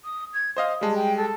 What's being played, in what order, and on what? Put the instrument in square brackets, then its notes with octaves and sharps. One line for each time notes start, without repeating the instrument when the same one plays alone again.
[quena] D#6
G#6
[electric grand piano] C5 D#5 F5 [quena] D#6
[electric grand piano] G3 G#3 [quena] A5
[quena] G5
A4